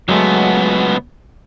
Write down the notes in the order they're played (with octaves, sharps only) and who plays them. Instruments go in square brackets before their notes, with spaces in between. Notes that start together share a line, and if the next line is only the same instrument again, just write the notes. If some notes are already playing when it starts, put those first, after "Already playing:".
[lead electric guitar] C#2 B3 [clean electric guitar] F#3 G#3 A3